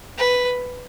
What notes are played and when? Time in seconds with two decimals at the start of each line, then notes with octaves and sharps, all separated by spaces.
0.18 B4